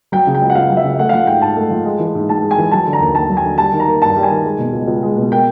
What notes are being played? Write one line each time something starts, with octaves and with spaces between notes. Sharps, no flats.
F#3 G5
C#3
G5
C#2
F#5
C#2 F5
F#3
E5
C#3
A3 F#5
F5
F3 F#5
G#2 G5
G#2 A5
A3
F3
G#3
E3
G#2
G#2 A5
G#3
G#5
E3
F#3 A5
D3
A#5
D#2
D#2 A5
F#3
G#5
D3
G3 A5
D#3
A#5
A#3
G2 A5
G3
G#5
D#3
G#3
B2
C#2
C#2
G#3
B2
A#3 G5